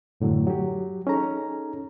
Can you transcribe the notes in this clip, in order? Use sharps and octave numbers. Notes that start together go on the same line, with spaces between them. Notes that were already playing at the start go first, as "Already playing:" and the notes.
F#2 A2 D3 F#3
F#3 G4
C#4 D#4 G#4 A4 A#5